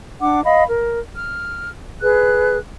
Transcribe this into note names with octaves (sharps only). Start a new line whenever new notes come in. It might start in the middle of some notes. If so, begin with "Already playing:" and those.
D4 F#5 D6
D#5 F5 B5
A#4
F6
G#4 B4 F#6